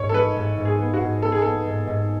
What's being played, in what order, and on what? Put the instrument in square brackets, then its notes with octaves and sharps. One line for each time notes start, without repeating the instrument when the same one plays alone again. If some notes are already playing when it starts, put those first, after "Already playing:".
Already playing: [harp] G#2 [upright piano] C#5
[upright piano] A4
[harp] G#3 [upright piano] B4
[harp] G#2
G#2
[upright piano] G#4
[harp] B3
[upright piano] F#4
[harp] G#2
[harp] B3 [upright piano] A4
[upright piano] G#4
[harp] B3 [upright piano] A4
[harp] G#2
G#2